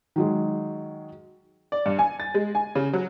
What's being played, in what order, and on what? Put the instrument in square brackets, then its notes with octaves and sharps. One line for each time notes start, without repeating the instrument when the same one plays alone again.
[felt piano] D#3 F#3 G#3
[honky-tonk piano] D5
G2
G#5
A6
G#3
G#5
C#3
F#3